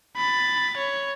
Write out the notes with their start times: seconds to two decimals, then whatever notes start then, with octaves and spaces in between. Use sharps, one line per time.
0.17 B5 A6
0.78 C#5